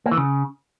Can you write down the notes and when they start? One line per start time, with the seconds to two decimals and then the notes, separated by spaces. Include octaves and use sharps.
0.06 A#3
0.11 E3
0.17 C#3